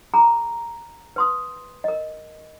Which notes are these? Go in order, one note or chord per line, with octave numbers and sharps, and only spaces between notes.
G#4 A#5 B5
B4 C6 D#6
A#4 D#5